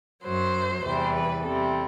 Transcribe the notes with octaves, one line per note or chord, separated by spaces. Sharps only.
F#2 F#3 C5
E2 C3 E3 G3 C5
B4
E2 C3 G3 A4